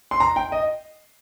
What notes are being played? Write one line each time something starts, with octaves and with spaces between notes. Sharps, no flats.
C6
A#5
G5
D#5